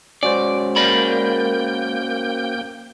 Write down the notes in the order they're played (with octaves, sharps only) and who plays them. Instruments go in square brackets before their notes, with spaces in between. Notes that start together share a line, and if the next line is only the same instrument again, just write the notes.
[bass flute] G#3 [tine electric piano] C#4 F#4 C5 [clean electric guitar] D5
[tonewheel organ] A#3 G5 G6 [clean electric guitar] A#4 D5 B5